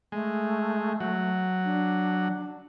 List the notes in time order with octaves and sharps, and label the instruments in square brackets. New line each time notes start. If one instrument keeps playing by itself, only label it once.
[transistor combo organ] G#3 [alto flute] A3
[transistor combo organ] F#3
[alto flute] D4